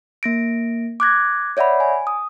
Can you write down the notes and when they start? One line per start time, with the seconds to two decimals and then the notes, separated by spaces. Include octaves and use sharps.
0.23 A#3 A#6 D7
1.00 D6 F#6 G#6 A#6
1.57 C#5 D5 E5 F#5 B5
1.80 G#5
2.07 D#6